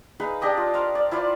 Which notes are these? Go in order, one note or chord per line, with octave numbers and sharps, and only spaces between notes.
D#4 G#4 B4 F5
D4 G4 D#5 G5
F4
A#4 C5 F5 A#5
D5
E4 F4 C5 D5